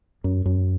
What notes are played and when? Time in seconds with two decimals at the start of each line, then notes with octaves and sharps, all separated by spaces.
0.24 F#2
0.46 F#2